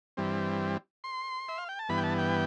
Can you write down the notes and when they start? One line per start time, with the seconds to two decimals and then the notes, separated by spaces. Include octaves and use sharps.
0.17 G2 E3 G3 C4
1.04 C6
1.49 E5
1.58 F5
1.69 G5
1.79 A5
1.89 G2 E3 B3 B5
1.98 G5
2.04 A5
2.18 G5